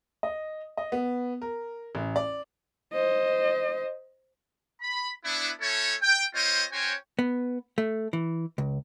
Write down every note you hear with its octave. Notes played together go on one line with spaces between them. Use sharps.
D#5
D#5
B3
A#4
A1
D5
C5 D#5
B5
B3 D4 E4
A3 C#4 E4 A4 C#5
G5
C4 F4 C5 C#5 D#5 G5
C#4 F#4 C5 C#5 G5 G#5
B3
A3
E3
C#2